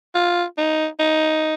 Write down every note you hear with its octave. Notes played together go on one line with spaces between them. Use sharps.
F4
D#4
D#4